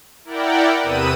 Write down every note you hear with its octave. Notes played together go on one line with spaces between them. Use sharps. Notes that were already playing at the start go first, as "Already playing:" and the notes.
E4 A#4 D5 F#5 G5
E2 C3 B4 D#6 E6 D#7